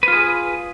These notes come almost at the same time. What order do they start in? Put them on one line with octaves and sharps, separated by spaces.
B4 F4 G#4